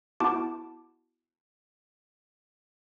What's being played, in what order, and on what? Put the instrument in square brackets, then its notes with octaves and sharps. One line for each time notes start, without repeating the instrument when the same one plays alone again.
[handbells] B3 E4 F#4 A5 D6